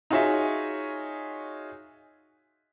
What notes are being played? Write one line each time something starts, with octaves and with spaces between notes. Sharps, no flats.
D#4 F4 F#4 G#4 C#5 E5